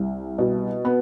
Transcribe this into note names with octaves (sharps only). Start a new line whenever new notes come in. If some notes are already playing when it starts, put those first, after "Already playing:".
Already playing: C2
B2
B3